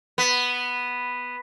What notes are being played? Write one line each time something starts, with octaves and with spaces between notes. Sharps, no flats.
B3